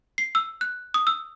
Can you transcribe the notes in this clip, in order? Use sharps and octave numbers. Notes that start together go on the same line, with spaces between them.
C7
E6
F#6
D#6
E6